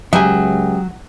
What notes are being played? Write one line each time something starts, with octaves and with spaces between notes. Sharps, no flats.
C#2 F#3 G4 E5 G5 G#5 D#6